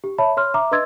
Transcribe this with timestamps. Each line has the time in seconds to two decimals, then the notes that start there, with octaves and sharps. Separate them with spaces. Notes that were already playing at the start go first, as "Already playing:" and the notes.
0.04 G4
0.18 C#5 E5 A5 B5
0.37 C#5 C6 F6
0.54 E5 A#5 D6
0.72 B4 D#5 C6 E6 G#6 A6